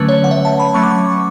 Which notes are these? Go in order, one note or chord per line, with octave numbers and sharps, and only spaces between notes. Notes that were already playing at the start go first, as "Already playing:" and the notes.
Already playing: D3 F#3 A3 C#4 B4
C#5
F#5
E5
A5
B5
F#3 A3 C#4 C#6
D6
C#6